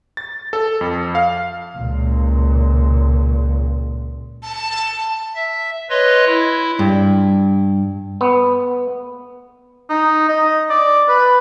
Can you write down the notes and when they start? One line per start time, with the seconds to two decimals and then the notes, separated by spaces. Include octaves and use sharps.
0.17 A6
0.53 A4
0.81 F2
1.15 F5
1.76 C#2 A#2
4.43 A5
5.35 E5
5.90 B4 C#5 D#5 C6
6.26 E4
6.79 G2
8.21 B3
9.90 D#4
10.28 D#5
10.70 D5
11.08 B4